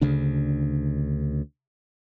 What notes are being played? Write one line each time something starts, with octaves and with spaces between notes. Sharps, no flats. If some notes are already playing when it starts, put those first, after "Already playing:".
D2 C#3 D4